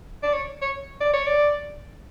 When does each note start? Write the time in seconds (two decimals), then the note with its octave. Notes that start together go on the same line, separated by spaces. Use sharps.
0.23 D5
0.33 C#5
0.62 C#5
1.01 D5
1.14 C#5
1.26 D5